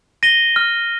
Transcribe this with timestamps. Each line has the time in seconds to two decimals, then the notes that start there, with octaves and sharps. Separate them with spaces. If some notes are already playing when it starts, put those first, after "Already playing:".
0.23 A#6 D#7 G7
0.56 F6